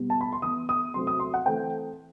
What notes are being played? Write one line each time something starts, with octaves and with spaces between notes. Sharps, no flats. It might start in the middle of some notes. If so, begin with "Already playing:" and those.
Already playing: B2 G3 B3
A5
B5
C6
E3 B3 D#6
D#6
C3 F#3 A3 C4 C6
D#6
C6
F#5
E3 A3 C4 G5